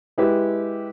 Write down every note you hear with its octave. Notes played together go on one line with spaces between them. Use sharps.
G#3 E4 G4 B4